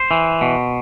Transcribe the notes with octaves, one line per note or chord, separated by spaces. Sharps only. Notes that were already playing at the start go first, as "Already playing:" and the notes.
Already playing: C5
E3
B2